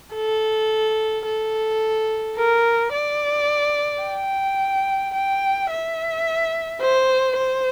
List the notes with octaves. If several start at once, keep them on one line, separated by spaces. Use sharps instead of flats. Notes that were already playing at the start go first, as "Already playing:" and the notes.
A4
A4
A#4
D5
G5
G5
E5
C5
C5